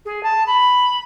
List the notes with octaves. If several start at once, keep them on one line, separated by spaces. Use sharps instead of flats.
G#4
A5
B5